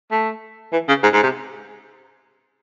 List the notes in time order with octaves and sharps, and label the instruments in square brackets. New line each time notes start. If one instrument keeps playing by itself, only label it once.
[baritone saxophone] A3
E3
C#3
G#2
G#2
C3